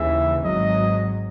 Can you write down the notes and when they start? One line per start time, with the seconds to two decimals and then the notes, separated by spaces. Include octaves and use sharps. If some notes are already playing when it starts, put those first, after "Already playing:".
Already playing: D#2 C#3 E3 E5
0.44 G#1 G#2 F#3 D#5